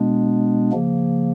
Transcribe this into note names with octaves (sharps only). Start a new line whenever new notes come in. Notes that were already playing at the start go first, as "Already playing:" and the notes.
Already playing: B2 G#3 B3 D4
C#3 F3 A#3